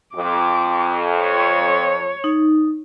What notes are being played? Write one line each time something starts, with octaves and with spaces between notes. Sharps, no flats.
F2 D6
C#5
D#4